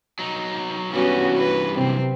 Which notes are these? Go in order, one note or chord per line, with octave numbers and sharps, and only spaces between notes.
F#3 D#4
G2 E3 G3 B3 C#4 F#4
B4
C3 F#3 C4